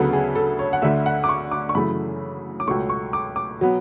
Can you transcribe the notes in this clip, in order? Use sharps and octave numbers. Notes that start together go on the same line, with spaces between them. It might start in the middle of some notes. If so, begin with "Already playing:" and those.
Already playing: D2 C#3 F#3 B3 A4
G#4
A4
C#5
F#5
D2 D3 A3 E5
F#5
D6
C#6
D6
C#6
F#2 C#3 E3 A3 B5
D6
C#2 B2 A3 C#6
C#6
D6
D6
B2 F#3 B3